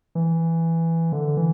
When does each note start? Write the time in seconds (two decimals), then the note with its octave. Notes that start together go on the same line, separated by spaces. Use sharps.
0.15 E3
1.12 D3
1.37 E3